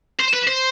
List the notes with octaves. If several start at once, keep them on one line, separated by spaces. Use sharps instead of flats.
C5
B4
C5